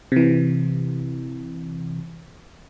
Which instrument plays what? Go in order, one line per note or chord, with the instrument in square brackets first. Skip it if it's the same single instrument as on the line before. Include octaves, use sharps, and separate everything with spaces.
[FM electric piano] C3 E3